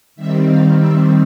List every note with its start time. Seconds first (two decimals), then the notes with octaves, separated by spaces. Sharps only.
0.15 D#3 G3 C4 E5
0.47 F5
0.78 E5